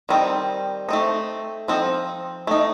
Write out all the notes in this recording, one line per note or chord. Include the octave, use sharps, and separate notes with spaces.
D#3 G3 C4 D#4
A3 C4 D#4
F3 C4 D#4
A3 D#4